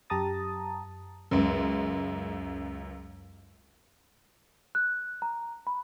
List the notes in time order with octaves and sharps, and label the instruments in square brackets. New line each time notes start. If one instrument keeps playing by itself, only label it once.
[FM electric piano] F#2 G4 A5 A#5 D#6 A6
[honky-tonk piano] C#2 F#2
[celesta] F#6
A#5
B5